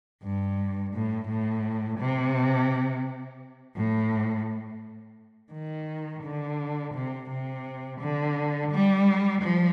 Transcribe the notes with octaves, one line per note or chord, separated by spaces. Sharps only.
G2
A2
A2
C3
A2
D#3
D3
C3
C3
D3
G3
F3